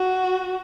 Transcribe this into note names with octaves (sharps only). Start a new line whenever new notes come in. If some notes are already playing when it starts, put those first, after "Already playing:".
Already playing: F#4